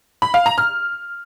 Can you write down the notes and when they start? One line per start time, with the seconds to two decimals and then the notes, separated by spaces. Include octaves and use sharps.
0.22 B5
0.34 F5
0.46 A#5
0.58 F6